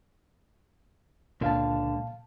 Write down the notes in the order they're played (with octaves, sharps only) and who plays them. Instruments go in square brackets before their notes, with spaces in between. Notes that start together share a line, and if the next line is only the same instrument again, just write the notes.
[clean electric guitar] C#2 D3 [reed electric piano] A#2 F5 A5